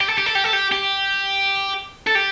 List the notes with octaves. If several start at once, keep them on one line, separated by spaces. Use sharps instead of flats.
G4
A4
G4
A4
G4
A4
G4
G4
A4
G4